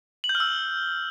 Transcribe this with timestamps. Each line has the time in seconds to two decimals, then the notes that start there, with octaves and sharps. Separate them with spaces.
0.24 F#7
0.29 G6
0.35 F6
0.40 E6